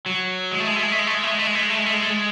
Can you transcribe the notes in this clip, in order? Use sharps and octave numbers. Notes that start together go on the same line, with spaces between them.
F#3
G#3
A3
G#3
A3
G#3
A3
G#3
A3
G#3
A3
G#3
A3
G#3
A3
G#3
A3
G#3
A3
G#3
A3
G#3